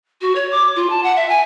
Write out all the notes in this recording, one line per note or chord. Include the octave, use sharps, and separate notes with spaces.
F#4
C#5
D6
F4
A5
F#5
E5
G#5